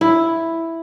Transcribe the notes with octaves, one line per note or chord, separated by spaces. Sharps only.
E4